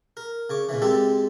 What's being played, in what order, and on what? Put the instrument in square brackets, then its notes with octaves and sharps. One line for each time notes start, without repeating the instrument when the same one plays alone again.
[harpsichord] A#4
C#3 C#5 D6
A#2 C#3 E3
G#3 C4 G4 A4 D5